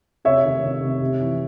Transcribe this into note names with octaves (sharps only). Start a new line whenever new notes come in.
C3 C#5 E5
D#3
C3
C3
C3
E3